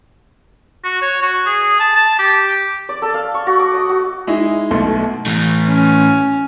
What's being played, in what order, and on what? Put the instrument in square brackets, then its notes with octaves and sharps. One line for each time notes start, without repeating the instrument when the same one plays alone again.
[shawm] F#4
C#5
F#4
G#4
A5
A5
G4
[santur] D5
A4
F5
C#6
F#4
D6
D#5
F#4
[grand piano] G#3 D#4 E4
B1 B2 A3 C6
[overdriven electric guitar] A2 E3
[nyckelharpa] C#4